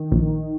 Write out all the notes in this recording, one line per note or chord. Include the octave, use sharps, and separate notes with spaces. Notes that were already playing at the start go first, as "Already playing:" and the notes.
Already playing: D#3
A#1